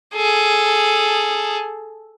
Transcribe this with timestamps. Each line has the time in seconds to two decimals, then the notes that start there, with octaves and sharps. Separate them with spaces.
0.15 G#4 A4